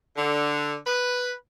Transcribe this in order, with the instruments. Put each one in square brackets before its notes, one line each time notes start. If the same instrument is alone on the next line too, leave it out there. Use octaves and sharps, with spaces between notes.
[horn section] D3
B4